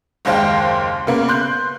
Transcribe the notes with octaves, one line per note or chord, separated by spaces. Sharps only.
F#1 D#2 G#3 C5 F5 G5
C#3 A#3 B3
C6 F#6 G6